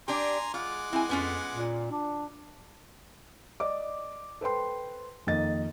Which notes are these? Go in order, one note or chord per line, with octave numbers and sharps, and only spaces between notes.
D4 G4 G#5 A#5 C6
G#3 F4 F#5 D6
C4 E4 G#5
F2 B3 C#4 F4
A#2
D4
D5 D#5 D6
A4 B4 C5 G5 C6
F2 D#3 A#3 D#5 A6